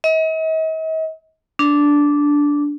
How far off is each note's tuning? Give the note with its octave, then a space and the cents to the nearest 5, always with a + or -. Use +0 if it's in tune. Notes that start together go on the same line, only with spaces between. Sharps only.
D#5 +45
D4 -10